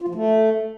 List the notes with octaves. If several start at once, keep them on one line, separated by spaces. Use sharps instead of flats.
F4
F3
A3